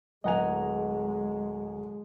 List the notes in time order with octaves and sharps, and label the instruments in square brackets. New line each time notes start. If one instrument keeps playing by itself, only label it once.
[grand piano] D1 A#5 F7 [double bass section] G#3 [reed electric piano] D#5 F#5 G#5